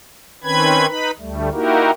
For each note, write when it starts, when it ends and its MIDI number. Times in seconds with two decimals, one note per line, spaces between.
0.44 0.87 51
0.44 0.87 60
0.44 0.87 61
0.44 0.87 71
0.44 0.87 83
0.44 0.87 92
0.87 1.11 63
0.87 1.11 71
0.87 1.11 83
1.19 1.49 38
1.19 1.49 55
1.19 1.49 57
1.53 1.91 58
1.53 1.91 63
1.53 1.91 64
1.53 1.91 66
1.53 1.91 67
1.53 1.91 70